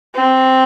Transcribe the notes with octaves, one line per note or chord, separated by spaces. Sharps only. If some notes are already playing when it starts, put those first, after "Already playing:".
C4